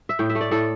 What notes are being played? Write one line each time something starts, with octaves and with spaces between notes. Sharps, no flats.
E5
A2 G5
E5
A3
D5
A2 A4